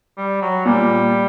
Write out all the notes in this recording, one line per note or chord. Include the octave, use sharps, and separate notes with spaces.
G3
F#3
A#2 G3